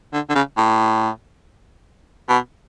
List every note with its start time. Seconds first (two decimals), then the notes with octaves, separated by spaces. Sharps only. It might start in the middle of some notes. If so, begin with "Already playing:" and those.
0.13 D3
0.29 D3
0.35 C#3
0.57 A2
2.29 B2